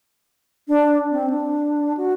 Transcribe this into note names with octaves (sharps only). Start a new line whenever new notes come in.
D4
C4
D4
F#4